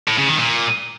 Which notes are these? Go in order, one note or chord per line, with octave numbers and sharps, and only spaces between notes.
A2
C#3
D#3
A#2